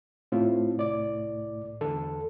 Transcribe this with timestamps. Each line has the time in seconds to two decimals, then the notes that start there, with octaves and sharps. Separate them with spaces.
0.32 A2 C4 F4
0.78 C2 D5 D6
1.81 E2 D3 A4